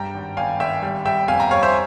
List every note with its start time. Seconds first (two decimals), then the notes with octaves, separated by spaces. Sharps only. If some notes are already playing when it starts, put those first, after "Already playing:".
Already playing: G2 G3 G5 A#5
0.14 G#1
0.37 G#1 F5 G#5
0.60 G#1 E5 G5
0.83 G3
1.05 G3 E5 G5
1.28 F2 F5 G#5
1.40 G5 A#5
1.51 G3 C#5 F5
1.63 C5 E5